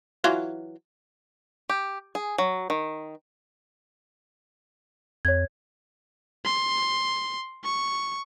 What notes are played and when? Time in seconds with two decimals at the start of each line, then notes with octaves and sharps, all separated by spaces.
0.24 E3 F#3 F4
1.69 G4
2.15 G#4
2.38 F#3
2.70 D#3
5.25 F2 C#5 G#6
6.45 C6
7.64 C#6